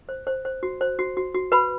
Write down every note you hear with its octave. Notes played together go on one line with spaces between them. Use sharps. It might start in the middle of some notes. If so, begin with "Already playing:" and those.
C5
C5
C5
F#4
C5
F#4
F#4
F#4
F#4 B4 B5